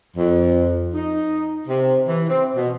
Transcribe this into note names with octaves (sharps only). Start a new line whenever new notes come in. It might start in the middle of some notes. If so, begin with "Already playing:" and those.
F2
D#4
C3
E3
C4
B2